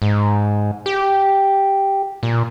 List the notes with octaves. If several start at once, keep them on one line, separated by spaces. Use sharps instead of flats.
G#2
G4
A#2